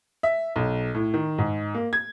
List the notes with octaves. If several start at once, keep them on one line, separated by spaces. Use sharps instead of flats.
E5
B1
A2
D#3
G#2
A#3
G#6